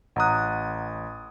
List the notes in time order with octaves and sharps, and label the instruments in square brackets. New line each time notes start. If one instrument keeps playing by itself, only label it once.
[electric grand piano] A1 D#6 [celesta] F#5 A#5 F#6